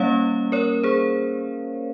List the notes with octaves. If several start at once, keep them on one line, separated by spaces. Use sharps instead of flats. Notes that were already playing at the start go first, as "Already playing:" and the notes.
Already playing: G3 A#3 C#4 C#5 F5
A#4 C#5
G#4 C5